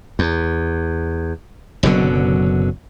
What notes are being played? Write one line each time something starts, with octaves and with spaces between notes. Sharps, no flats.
E2
F#1 B2 D3 F#3